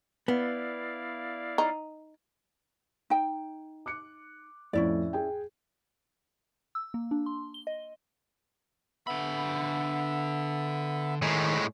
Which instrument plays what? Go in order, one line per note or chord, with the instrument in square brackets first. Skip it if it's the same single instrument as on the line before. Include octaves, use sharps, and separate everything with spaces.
[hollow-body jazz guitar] B3 [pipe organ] E4 D5 F5
[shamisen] D#4
[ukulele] D#4 G5
[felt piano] D6 F#6 C#7
[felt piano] F2 A2 [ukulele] C#4 E4 D5
[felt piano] G#4 G5
[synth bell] E6
A#3
D4
C6
G7
D#5
[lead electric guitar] D3 B5 [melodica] B3 E5
[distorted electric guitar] A2 G#3 [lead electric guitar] D#3